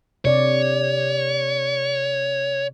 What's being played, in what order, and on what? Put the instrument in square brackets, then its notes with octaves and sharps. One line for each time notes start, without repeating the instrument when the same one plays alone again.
[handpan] C3 D5 [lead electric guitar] C#5